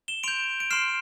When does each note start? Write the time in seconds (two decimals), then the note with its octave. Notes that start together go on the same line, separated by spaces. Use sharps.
0.08 E7 G7
0.23 C6 G6 D7 F7
0.60 D7
0.71 C6 F6 C7 E7